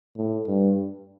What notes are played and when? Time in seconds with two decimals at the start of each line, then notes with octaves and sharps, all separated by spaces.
0.17 A2
0.47 G2